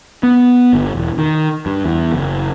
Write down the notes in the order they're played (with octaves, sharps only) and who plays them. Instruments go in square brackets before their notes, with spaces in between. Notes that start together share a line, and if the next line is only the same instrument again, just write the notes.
[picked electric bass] B3
G1
E1
D#3
G2
E2
F#1